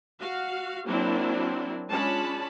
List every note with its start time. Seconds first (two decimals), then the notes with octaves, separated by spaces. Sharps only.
0.20 F#4 F5
0.86 F#3 A#3 C4 D4 E4
1.90 G#3 C#4 D4 F4 A5 B5